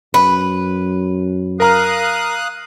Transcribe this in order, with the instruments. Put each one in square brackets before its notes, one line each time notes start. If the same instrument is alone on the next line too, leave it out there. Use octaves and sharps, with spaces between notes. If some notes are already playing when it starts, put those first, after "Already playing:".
[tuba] F#2 [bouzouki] B4
[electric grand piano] A#4 A#5 F6 [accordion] F5 D#6 F#6